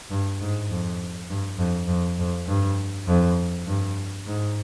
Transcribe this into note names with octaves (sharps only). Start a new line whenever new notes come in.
G2
G#2
F2
G2
F2
F2
F2
G2
F2
G2
G#2